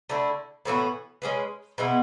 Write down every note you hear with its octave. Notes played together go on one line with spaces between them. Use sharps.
D3 A3 E4
A2 E3 B3 F#4
G#3 C#4 G#4 B4
B2 G#3 B3 E4